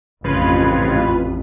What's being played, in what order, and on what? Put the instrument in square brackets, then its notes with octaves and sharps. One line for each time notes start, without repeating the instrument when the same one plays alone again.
[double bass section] A1 F2 [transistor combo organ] G#2 C#3 F3 [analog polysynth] F4 B4